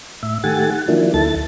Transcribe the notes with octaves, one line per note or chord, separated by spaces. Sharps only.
A2 E5
D#3 A3 G4 F#5 G#5 A6
F#5
D#3 F3 F#3 A#3 D4 E4
D2 E4 A4 A6